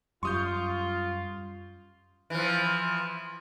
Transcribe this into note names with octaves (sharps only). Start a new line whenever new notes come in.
F#2 G3 F4 C6 C#6 D#6 G6
E3 F3